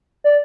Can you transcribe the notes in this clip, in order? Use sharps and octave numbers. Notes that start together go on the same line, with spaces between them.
D5